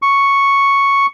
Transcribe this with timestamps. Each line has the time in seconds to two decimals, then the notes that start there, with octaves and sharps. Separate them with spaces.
0.02 C#6